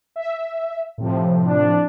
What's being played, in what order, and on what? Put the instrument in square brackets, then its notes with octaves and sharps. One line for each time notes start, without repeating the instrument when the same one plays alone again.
[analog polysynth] E5
A2 C3 F3
[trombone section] D4